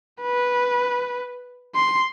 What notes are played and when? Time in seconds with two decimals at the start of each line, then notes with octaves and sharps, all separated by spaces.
0.22 B4
1.75 C6